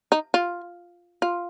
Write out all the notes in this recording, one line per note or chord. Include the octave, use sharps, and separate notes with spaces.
D#4
F4
F4